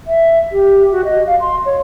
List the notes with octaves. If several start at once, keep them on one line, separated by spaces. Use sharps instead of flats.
E5
G4
F#4
D#5
F5
C6
C#5